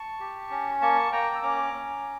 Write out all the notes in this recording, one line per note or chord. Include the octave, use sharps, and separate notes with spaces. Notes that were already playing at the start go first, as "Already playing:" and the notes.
Already playing: A5 C#6
G4
C#4
A#3 A5 C#6
A#3 G5 A#5
E6
C#4 A#5 D6
C#4